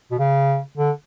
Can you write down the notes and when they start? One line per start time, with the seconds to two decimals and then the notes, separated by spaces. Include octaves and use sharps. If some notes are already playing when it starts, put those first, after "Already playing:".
0.11 B2
0.19 C#3
0.78 D3